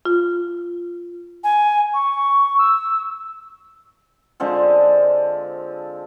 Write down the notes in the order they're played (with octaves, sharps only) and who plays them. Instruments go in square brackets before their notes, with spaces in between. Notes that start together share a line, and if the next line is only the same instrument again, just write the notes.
[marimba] F4
[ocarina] G#5
C#6
E6
[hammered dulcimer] D3 F3 G#3 C4